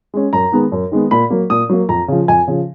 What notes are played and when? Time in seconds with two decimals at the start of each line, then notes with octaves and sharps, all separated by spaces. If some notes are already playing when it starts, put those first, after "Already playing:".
0.14 G#3 C#4
0.33 F#2 A#5
0.52 D#3 G#3 B3
0.72 F#2
0.92 D#3 G#3 B3
1.11 A#2 B5
1.30 F#3 A#3
1.50 A#2 D#6
1.69 F#3 A#3
1.89 F2 A#5
2.08 C#3 F3
2.28 F2 G#5
2.48 C#3 F3